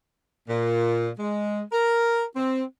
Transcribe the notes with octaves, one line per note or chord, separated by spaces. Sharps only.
A#2
G#3
A#4
C4